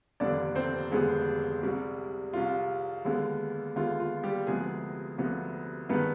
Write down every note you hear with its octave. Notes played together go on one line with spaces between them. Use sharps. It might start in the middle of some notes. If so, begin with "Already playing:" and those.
F1 D#2 D3 G3 B3 D4 D5
C4 C5
F1 D#2 D3 G3 G#3 B3 G#4
C2 C3 G3
C2 C3 G3 F4
D#2 D3 G#3 B3
D#2 D3 G#3 B3 F4
F4
G3 G4
D2 C3 F3 G#3 B3 G#4
D2 C3 F3 B3
G2 D#3 G#3 B3 B4